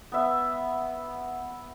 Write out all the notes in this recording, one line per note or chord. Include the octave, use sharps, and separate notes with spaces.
B3 E5